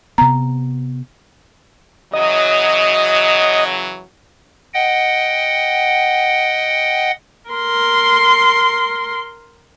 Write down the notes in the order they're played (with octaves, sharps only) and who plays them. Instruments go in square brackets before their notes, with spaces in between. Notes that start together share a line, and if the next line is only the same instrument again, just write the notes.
[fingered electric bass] C3 B3 [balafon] A#5
[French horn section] C#3 E3 F#3 [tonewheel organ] D#5
[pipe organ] D#5 F#5 G5
[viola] A#4 C6